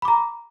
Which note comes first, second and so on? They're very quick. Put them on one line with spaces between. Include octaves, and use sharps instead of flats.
B5 D6 A#5